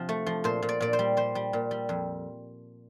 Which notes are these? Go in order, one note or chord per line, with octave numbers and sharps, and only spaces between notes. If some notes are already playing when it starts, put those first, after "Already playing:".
Already playing: C3 F3
A3
F3
A#2 C5
A#2
D5
A#2 D5
C5
G3
G3 C5
G3
A#2
G3
F2